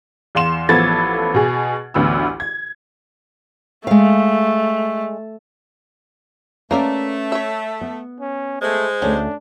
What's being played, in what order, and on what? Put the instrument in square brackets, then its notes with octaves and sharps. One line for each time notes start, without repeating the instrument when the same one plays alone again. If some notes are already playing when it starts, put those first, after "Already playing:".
[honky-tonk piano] E2 F5 C6 E7
A1 F3 B3 A4 G#6 A6
B2 G#4
A1 D2 B3 E6
G#6
[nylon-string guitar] G#3 F5 [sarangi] A3
[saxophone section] A3 [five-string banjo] A#3 A#4 D5 [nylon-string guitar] C#4 B4
[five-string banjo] C#5 E5
[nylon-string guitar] B3
[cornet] C#4
[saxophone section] G#3 C5 [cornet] A3
[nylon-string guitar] D2 A3 [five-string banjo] C#4 [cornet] D4